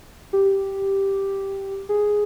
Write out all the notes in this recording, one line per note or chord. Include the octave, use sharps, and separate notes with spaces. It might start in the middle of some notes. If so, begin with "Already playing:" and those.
G4
G#4